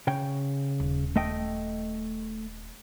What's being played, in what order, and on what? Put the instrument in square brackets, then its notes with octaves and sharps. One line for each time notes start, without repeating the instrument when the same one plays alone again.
[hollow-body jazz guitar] C#3 C#5 G5
[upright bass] D#1
[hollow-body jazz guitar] A3 D#5 G5